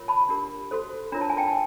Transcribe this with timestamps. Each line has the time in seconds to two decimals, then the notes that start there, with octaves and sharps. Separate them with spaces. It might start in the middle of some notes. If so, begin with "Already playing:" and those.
Already playing: F4 A#4 C#5
0.08 A5 B5
0.29 D4 G4 A#4
0.71 F#4 A4 C5
1.12 D4 F4 A#4 C#5 A#5
1.21 A5
1.30 G#5
1.37 G5 A5
1.48 A5